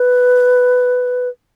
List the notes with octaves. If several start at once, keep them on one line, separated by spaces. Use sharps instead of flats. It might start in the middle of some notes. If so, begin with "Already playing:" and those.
Already playing: B4